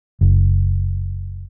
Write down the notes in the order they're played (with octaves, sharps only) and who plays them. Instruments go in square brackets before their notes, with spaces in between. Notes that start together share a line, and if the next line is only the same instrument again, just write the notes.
[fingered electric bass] F#1